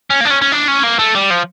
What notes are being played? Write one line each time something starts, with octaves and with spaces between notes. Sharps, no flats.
C#4
A#3
D4
C#4
C#4
D4
C#4
A#3
A3
G3
F3